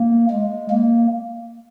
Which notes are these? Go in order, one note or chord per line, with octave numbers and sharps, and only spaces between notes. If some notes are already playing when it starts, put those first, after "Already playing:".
Already playing: A#3
G#3
A#3